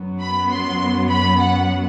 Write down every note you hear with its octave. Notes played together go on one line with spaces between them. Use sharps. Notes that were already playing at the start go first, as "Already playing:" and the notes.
Already playing: F#2 F#3 B3
B5
C6
B5
F#5